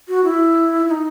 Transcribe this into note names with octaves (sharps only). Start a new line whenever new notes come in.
F#4
E4
E4
D#4